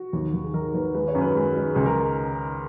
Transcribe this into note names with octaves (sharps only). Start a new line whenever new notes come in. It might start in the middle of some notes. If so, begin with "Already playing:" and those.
Already playing: F#4
D#2
D#2
G#4
D#3 A#4
D#2 B4
G#3 B4
C#5
F#2
B4
G#3
G#3
C#2 G#4
A#4